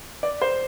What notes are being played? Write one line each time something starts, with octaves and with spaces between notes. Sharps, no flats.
D5
C5